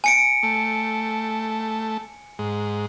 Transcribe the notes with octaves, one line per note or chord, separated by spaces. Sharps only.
G#5 C#7 D7
A3
G#2